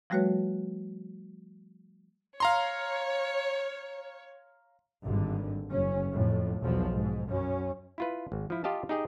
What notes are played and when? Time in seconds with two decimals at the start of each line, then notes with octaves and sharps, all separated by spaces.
0.10 F3 G3 A3 F#4 B4 C#5
2.40 C#5 F5 A#5 C6
5.03 G#1 G2 D3
5.71 F#1 C#4
6.11 F2 A2
6.60 B1 E2 F3
6.93 G#2
7.28 F#2 C#4
7.98 E4 F4 B4
8.32 G#1
8.50 F3 E4
8.64 F4 G4 D#5 F5 A5
8.89 D#4 G4 G#4 D#5 G5